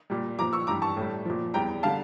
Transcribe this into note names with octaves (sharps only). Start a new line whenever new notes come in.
A#2 G3
A#2 F3 A#5 D6
C#6 E6
G2 E3 G3 A#5 D6
A5 C#6
A2 G3
A#2 F3
E2 E3 G3 G5 A#5
D3 G3 F5 A5